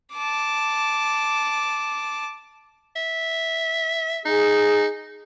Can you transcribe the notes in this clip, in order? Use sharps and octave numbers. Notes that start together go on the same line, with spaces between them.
A5 D6
E5
D#4 G#4